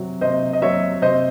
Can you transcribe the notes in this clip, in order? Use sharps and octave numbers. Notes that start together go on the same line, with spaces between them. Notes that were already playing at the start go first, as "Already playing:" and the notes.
Already playing: C3 F#3
C3 C5 D#5
D#5
F#3 C#5 E5
C3 C5 D#5